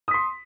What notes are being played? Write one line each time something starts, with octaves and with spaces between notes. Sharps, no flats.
C6 D#6 B6